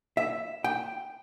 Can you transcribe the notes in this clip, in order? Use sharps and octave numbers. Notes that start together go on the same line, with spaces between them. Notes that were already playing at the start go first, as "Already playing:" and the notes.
E5
G5